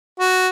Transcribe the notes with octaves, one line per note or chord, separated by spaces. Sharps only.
F#4